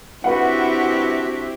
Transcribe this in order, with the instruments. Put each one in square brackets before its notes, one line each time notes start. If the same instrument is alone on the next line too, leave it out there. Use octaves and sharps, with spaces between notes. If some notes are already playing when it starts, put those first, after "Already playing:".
[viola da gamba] C4 E4 G4 [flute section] D4 F#4 E5 [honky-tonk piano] B4 F#5